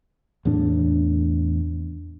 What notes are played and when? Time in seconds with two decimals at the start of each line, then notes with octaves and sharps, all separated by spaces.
0.45 E2 A2 D4